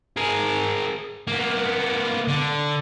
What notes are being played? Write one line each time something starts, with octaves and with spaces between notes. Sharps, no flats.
G#4 A#4
A#3 B3
D3